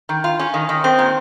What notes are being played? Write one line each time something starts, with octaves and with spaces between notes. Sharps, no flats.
D#3
F4
C#4
D#3
D#3
C4
A#2